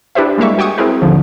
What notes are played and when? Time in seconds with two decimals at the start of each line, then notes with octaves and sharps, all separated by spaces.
0.15 D4 E4 G4 B4 C5 E5
0.38 G3 G#3 A#3 E5 C#6
0.58 F#4 G5 G#5 C#6 D#6
0.78 C4 E4 G#4 A#4 B4
1.02 D#2 A#2 D3 F3